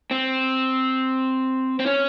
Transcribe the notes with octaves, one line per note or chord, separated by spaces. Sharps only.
C4
C4
C#4